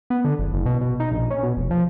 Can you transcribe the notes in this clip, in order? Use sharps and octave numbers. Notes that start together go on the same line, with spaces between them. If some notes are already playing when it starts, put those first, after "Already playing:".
B3
D3
F#1
F#1
B2
B2
D#4
A#1
C#4
B2
F1
F3